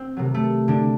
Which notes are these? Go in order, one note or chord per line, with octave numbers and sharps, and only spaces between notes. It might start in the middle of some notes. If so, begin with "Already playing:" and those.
Already playing: C4
C3 D#3 F#3 A3
A3
D3 D4